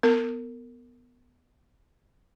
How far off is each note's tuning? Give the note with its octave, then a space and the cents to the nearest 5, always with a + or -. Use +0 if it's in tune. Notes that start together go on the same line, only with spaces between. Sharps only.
B3 +0 A#4 -30